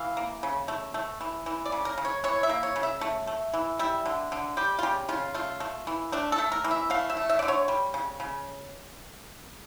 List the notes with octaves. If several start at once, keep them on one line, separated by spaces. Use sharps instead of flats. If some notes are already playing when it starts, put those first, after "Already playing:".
Already playing: E3 F5
A#3
C#3
A3
A3
E3
E3
D5
C#3
A#4
C#3
C#5
E3 C#5
E5
A#3
C#5
C#3
E5
A3
A3
E3
G3 E5
D3
D3
G3 G4
F4
C#3 G4
C#3 F4
A3 F4
A3
E3
A3 D4
A4
A3
A#4
E3
E5
A3 F5
E5
A3
E5
D5
D3
C#5
G3
C#3
C#3